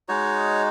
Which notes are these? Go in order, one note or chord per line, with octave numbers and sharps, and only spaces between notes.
G#3 D#4 F#4 C#5